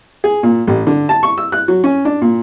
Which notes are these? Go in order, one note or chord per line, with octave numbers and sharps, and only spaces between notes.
G#4
A#2
A1
D3
A5
C#6
E6
F#6
F#3
C#4
D4
A#2